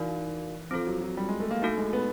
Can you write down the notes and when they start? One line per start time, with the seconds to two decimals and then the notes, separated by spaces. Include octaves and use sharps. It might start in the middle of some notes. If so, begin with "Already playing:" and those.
Already playing: E3 D#4 F#4 A#4 D5 F5
0.71 F3 C4 F4 A4
0.87 F#3
1.01 F#3
1.17 G3
1.29 G#3
1.40 A3
1.51 A#3
1.62 A3 D#4 F#4 A4
1.78 G#3
1.93 B3